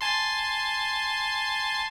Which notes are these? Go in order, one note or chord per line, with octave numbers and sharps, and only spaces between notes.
G#5 A5 C6